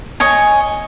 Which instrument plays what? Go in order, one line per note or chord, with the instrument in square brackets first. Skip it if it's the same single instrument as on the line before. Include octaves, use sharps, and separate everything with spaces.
[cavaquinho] C#5 D#5 G#5